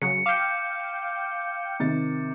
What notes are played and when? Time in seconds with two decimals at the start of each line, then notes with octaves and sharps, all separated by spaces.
0.02 C#3 F#3 C#7
0.26 F5 G5 D6 G6
1.79 C3 D#3 A6